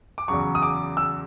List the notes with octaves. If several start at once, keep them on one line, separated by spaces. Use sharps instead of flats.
D6
E2 C#3 F#3 C#6
D#6
D6
E6